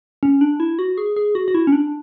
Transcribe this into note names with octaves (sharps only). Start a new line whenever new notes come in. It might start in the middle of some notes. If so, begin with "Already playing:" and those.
C#4
D4
E4
F#4
G#4
G#4
F#4
F#4
E4
C#4
D4